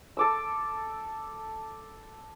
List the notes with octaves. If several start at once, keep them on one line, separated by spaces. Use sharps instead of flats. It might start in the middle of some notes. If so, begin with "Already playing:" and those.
A4 D6 E6